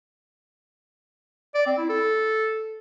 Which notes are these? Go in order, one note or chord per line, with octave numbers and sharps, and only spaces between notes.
D5
C4
E4
A4